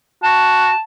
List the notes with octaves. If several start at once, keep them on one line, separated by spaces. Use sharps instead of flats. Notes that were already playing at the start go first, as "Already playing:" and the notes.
F#4 A5